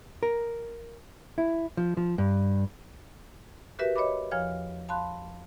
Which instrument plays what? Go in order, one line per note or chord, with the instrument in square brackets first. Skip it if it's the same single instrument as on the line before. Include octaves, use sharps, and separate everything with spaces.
[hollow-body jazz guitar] A#4
E4
F3
F3
G2
[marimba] F#4 G4 A#4 B4 E5
C#5 D#5 E5 B5 D6
E2 F3 C#5 F5 F6
F5 A5 B5 C6 F#6